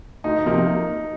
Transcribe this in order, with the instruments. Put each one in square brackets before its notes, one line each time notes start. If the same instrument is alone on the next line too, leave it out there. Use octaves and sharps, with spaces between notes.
[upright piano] D2 [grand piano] D#4
[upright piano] C3 F3 A#3